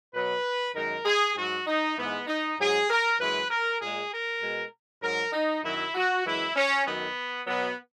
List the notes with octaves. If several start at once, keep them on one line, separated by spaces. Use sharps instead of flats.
B2 F#3 B4
F#2 D#3 G#3 A#4
G#4
G#2 F#3 F#4
D#4
G#2 E3 G#3 B3
D#4
G#2 F#3 G#4
A#4
F#2 E3 G#3 B4
A#4
A#2 G#3 G#4
A#4
B2 G#3
G#2 F#3 A#4
D#4
F#2 D#3 F#3 E4
F#4
F#2 E3 G#3 E4
C#4
F#2 D#3 F#3 B3
B2 F#3 B3